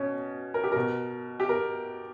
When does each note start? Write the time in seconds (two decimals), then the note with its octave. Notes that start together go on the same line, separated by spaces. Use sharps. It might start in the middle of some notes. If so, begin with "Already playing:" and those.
Already playing: B2 C#4
0.54 A#4
0.64 G4
0.72 B2 A#4
1.40 G4
1.49 A#4